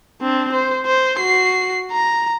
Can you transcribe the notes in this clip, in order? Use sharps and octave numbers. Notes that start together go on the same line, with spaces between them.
C4 D4
C5
C5
F#4 C7
A#5